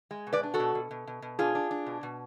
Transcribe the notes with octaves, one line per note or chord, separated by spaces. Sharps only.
G#3
B2
B4 D5
D4
F#4 A4
B2
B2
B2
B2
B2
D4 F4 G#4
D4
D4
B2
B2